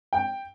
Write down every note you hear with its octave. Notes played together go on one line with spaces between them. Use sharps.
G5